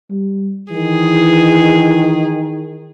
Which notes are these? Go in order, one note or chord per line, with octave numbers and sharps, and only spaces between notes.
G3
D#3 E3 G#4